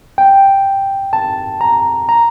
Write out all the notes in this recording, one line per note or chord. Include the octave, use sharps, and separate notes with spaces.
G5
A5
A#5
A#5